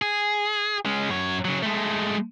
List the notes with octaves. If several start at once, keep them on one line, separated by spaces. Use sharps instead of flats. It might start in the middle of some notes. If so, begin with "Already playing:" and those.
G#4
G#3 C#4
F#2 C#5
C#3 F#3
G#3 A3